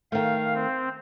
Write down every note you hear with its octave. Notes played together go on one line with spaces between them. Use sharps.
D#3 A3 F5
C4